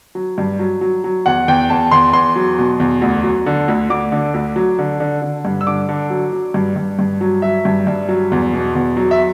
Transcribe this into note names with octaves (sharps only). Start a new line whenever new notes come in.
F#3
G2
F#3
F#3
F#3
E2 F#5
E2 G5
E2 A5
E2 C6
E2 C6
F#3
B2
E2
D2
F#3
D3
D2
D2 D6
D3
D2
F#3
D3
D3
D3
G2
E6
D3 D6
D3
F#3
F#3
G2
G2
G2
F#3
F#3 E5
G2
G2
F#3
E2
B2
E2
F#3
E5